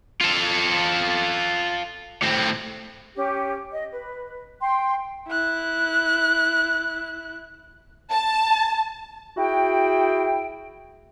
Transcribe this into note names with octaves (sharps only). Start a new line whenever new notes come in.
F4 A4
A2 C4
C#4 G4
D#5
B4
G5 C6
E4 F#6
A5
E4 F#4 G#4 G5